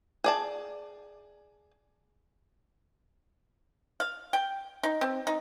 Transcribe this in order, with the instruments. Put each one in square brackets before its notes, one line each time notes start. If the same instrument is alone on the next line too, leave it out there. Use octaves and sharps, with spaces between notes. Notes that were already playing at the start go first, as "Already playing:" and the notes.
[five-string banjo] G#4 D5 A5
[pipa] F5
G5
D#4
C4
D#4